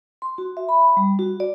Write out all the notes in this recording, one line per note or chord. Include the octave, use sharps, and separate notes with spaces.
C6
F#4
E5
B5
G3
F#4
D5